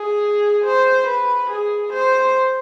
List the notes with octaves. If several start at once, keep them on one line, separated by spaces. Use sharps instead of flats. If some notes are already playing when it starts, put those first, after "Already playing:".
Already playing: G#4
C5
B4
G#4
C5